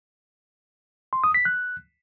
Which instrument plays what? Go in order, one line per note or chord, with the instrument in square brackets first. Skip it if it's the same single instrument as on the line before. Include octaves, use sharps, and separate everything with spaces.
[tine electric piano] C6
D#6
B6
F#6